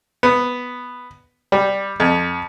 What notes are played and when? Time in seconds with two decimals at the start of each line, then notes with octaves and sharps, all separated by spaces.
0.23 B3
1.52 G3
2.00 F2